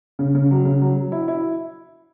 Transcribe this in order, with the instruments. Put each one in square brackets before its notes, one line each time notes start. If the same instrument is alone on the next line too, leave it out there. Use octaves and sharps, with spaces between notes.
[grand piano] C#3
C#3
F#3
C#3
F#3
F#3
E4
E4